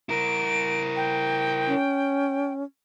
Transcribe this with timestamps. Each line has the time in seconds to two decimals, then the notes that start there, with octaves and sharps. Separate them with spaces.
0.09 E4 A#4 D7
0.96 G5
1.67 C#4